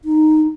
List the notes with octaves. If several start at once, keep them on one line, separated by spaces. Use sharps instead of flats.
D#4